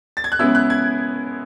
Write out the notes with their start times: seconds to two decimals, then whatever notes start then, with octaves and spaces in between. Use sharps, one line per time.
0.17 A6
0.24 G#6
0.32 F#6
0.39 C#3 G#3 B3 E4 E6
0.55 F#6
0.70 G#6